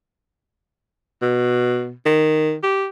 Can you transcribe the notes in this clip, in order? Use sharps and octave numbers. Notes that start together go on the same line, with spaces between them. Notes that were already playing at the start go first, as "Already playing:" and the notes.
B2
D#3
G4